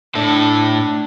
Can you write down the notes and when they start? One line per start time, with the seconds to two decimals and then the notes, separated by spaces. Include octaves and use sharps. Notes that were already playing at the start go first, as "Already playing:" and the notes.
0.15 A2 D4 A4